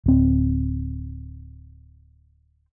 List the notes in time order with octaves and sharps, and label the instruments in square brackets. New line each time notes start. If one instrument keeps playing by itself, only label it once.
[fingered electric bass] D1 C4